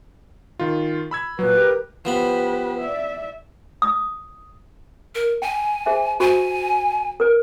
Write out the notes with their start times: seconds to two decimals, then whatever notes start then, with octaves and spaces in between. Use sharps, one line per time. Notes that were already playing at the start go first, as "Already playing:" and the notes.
0.59 D#3 F4
1.11 B5 E6 G#6
1.39 A#2 F#3 B4
1.57 G4 A#4
2.05 F3 B3 G4 B4 B5
2.79 D5 E5
3.82 D#6
5.15 A#4
5.42 G5 G#5
5.86 G#4 C5 E5
6.20 F#4 C5 G#5 C#6
7.20 A#4 B4